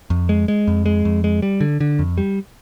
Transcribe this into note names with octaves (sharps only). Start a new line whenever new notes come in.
F2
G#3
G#3
F2
G#3
F2
G#3
G3
D3
D3
F2
G3